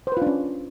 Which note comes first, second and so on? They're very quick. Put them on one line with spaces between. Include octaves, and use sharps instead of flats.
C5 B4 F4 D4 C#4